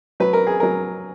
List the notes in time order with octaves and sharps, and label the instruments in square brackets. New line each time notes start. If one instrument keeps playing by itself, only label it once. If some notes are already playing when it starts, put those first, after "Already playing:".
[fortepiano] F#3 B4
A#4
G#4
F#3 A#4